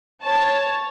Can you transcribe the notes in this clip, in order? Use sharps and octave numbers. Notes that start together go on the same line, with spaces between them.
C#5 A5